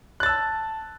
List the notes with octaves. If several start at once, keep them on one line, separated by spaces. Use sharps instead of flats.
A5 E6 F#6 A6